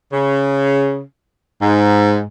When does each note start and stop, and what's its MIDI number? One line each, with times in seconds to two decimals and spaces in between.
0.12 1.02 49
1.61 2.23 44